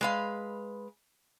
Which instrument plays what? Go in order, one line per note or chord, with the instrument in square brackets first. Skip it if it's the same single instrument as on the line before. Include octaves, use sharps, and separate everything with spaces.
[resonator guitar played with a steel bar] G#3 B4 F5